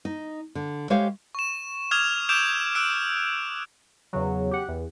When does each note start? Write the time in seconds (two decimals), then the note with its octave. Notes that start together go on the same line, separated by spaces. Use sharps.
0.05 D#4
0.55 D3
0.90 G#3 G4 C5 C#5 E5 F5
1.35 C#6 E7
1.91 D6 D#6 F6 G#6 F7
2.29 D6 E6 G6 D7 E7 F7
2.75 E6 F#6 D7
4.13 E2 C#3 F#3
4.51 G4 F#5
4.68 E2